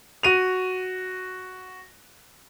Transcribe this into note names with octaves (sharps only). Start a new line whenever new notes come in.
F#4 D#7 F7